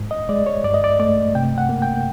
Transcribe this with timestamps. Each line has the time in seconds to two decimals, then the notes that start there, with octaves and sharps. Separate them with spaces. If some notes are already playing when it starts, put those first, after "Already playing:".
Already playing: G#2
0.11 D#5
0.29 G#3 D5
0.46 C#5
0.64 G2 D5
0.74 D#5
0.84 D5
0.99 A3 D5
1.35 C3 G5
1.58 F#5
1.69 A#3
1.82 G5